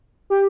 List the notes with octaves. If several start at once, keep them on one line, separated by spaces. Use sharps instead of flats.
G4